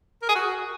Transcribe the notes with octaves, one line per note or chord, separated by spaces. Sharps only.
A#4
G#4
F#4